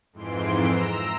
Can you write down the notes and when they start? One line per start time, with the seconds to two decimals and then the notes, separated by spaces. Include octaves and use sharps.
0.13 F2 G#2 E3 C6 D7
0.65 A#5 E6